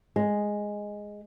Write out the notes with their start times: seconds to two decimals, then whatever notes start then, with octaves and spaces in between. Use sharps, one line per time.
0.16 G#3